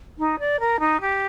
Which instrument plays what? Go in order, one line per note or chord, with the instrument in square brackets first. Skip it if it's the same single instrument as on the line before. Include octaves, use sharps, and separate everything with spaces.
[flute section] D#4
D5
A#4
D#4
G4